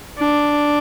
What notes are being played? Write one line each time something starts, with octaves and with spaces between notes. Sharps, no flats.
D4